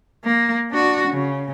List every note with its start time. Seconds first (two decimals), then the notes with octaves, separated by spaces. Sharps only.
0.24 A#3
0.71 D4 F#4
1.09 C#3